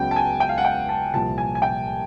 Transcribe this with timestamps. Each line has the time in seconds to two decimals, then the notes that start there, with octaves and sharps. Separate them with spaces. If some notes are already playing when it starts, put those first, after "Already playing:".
Already playing: C#2 C#3 F#3 B3 G5
0.11 A5
0.16 G#5
0.40 G5
0.49 F5
0.58 F#5
0.65 G5
0.89 A5
1.13 C2 A#2 F3 A5
1.38 G#5
1.55 G#5
1.62 G5